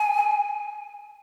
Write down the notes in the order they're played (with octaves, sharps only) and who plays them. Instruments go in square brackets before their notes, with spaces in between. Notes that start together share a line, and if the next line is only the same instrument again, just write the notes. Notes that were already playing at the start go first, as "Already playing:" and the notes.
Already playing: [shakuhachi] G#5